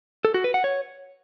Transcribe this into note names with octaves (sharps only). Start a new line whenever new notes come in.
A4
F#4
B4
F#5
C#5